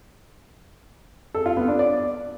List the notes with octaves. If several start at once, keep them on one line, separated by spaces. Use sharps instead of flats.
A4
F4
B3
D4
D5